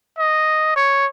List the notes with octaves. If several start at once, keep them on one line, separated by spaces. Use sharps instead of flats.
D#5
C#5